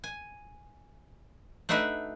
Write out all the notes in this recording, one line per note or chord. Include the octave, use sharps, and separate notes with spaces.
G#5
A3 D4 D#4 F#4 B4 E5